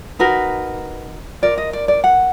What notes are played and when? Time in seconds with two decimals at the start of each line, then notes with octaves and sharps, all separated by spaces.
0.19 D#4 F#4 A#4 B4
1.42 F4 A#4 D5
1.58 D#5
1.73 D5
1.88 D5
2.04 F#5